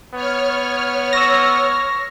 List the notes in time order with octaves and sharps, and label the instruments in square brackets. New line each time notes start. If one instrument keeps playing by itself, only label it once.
[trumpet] B3 [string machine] C#5 F6
[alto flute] C#6 [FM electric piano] E6 A#6